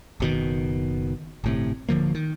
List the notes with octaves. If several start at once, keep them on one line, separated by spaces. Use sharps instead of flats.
F#1 B2 D#3
G1 A2 C3
D1 D3 F3 A#3
D#3